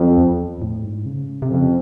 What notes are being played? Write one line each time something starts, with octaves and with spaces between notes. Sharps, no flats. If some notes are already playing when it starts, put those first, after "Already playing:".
Already playing: F2
E2
A2
G#2
C#3
C3
F2 C#3